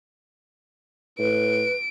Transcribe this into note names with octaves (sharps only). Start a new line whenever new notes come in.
A2 B4 D7